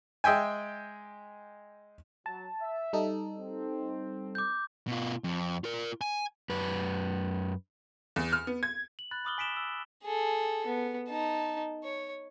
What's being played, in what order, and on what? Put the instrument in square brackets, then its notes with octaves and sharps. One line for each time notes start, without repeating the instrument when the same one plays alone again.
[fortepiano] G#3 D#5 E5 G5 G#5
[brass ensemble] F#3 [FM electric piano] A5
[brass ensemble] E5
[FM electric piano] G3 D#4 A4
[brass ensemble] C4
[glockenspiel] D6 G6
[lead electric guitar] B2 F4
F2
F4 A#4
G#5
[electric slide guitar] F#2 B4
[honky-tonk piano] E2
F6
B3
G#6
[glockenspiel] F#7
B5 F#6 A6
B5 D6 D#6 F6 F#7 G7
G#5 B6 D7 E7 G7
E6
[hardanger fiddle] G#4 A4
B3
D#4 A5
C#5